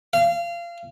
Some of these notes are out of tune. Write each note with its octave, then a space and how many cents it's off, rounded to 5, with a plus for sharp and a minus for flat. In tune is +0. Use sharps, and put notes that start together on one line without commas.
F5 -25